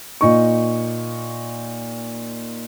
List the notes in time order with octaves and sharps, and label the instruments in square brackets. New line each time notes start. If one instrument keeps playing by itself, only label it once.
[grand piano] A#2 D#4 C#6